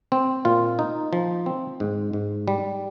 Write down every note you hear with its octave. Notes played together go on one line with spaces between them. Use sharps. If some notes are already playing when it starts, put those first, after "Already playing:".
C4
A#2 F4
D#4
F3
C4
G#2
G#2
G3